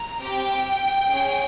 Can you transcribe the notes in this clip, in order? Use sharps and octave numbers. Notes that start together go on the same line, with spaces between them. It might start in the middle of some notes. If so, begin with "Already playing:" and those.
Already playing: A#5
C4 G4 G5
C#4 G#4